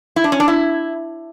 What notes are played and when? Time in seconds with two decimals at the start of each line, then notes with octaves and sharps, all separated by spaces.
0.16 E4
0.24 D4
0.32 C#4
0.40 D4
0.48 E4